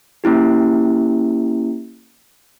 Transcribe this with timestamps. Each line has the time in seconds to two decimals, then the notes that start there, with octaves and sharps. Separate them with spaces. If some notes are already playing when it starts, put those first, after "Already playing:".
0.24 A#3 C#4 E4 G4